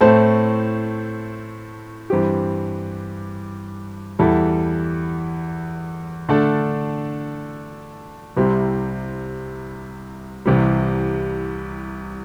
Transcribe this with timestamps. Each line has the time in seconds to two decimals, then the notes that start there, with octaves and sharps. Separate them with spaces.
0.01 A2 A3 C4 A4 C5
2.10 G2 E3 C4 G4
4.19 E2 E3 G3 E4 A4
6.29 D3 A3 D4 A4
8.37 C2 C3 G3 C4 E4
10.46 C2 C3 E3 G3